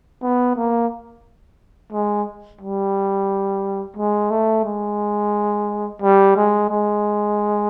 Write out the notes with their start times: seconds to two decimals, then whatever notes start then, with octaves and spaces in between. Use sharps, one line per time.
0.22 B3
0.56 A#3
1.92 G#3
2.61 G3
3.97 G#3
4.31 A3
4.65 G#3
6.02 G3
6.37 G#3
6.70 G#3